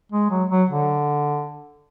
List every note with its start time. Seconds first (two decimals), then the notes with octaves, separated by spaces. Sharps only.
0.12 G#3
0.30 F#3
0.50 F#3
0.70 D3